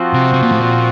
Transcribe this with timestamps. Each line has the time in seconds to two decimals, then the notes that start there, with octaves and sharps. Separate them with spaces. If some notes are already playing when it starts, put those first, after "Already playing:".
Already playing: F3 C4 F#4
0.13 C3
0.34 C3
0.42 A#2
0.52 A2
0.61 A#2